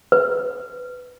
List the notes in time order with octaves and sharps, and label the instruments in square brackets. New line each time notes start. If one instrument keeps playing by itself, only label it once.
[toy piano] B4